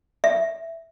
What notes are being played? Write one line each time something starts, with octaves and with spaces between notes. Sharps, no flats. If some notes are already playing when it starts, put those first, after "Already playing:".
E5